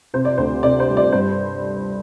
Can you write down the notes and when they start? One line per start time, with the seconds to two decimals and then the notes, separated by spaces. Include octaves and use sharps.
0.14 C3 C5
0.25 D5
0.38 D2 C5
0.62 C3 D5
0.80 C5
0.88 G3
0.97 D5
1.12 G2 C5